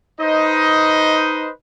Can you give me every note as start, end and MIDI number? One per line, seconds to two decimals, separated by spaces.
0.21 1.50 63
0.21 1.50 71
0.21 1.50 72
0.21 1.50 75